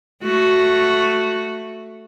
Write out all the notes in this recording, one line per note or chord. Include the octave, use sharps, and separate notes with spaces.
A3 F#4